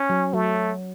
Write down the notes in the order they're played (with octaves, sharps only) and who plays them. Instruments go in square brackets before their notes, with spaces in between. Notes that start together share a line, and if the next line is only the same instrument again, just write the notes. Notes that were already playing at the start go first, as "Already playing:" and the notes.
Already playing: [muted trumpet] C#4
[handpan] F#3
[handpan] F#3 [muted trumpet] A3